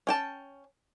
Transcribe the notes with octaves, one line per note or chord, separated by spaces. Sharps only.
C#4 G5 A5